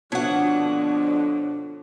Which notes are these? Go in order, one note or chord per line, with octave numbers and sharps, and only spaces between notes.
F2 B2 D3 F3 D4 C#5 F#5